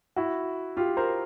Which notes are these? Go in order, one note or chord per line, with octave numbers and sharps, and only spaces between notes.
E4 F#4
F4 G4
A#4 C5